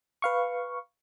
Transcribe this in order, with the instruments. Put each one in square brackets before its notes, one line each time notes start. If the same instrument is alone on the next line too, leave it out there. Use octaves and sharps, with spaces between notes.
[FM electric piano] B4 F5 C#6